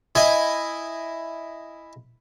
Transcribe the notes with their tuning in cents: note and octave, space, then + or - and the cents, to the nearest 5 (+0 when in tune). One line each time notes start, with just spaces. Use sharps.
E4 +0 D#5 +0 G#5 -5